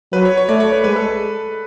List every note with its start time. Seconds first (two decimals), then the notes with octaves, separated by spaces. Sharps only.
0.13 F#3 B4
0.25 C#5
0.37 C#5
0.49 A3 D5
0.60 C#5
0.72 B4
0.84 G#3 B4
0.96 A4